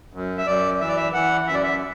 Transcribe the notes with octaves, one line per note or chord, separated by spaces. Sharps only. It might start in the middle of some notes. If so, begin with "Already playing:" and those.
F#2
E5
F#2 D5
E3 E5
D5
E5
E3 F#5
F#2 E5
D5
E5